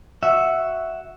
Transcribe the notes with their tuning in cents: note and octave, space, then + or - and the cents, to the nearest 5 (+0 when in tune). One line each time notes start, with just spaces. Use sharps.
F#4 +0 E5 +0